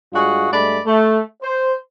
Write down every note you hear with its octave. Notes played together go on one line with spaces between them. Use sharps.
G2 G#3 F4 F#4 G#4 F#5
G2 G#3 A3 D5 B5
A3
C5